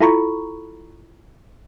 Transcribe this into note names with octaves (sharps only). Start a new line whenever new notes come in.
E4 F4 A4 A#5 B5 C#6